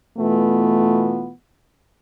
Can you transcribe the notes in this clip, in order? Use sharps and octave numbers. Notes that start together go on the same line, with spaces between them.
B2 E3 A3 B3 F4